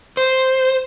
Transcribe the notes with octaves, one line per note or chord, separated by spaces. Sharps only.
C5